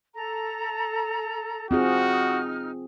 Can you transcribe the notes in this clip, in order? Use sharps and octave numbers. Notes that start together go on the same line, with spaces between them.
A4 A#5
C4 D#4 F4 F#4 G#4 F6